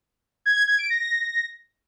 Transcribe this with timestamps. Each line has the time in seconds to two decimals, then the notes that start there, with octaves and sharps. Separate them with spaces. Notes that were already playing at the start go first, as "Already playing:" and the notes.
0.46 G#6
0.57 G#6
0.68 G#6
0.79 D7
0.90 A#6